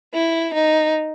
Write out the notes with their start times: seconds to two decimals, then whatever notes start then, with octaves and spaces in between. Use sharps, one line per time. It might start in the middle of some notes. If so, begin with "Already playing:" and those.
0.14 E4
0.54 D#4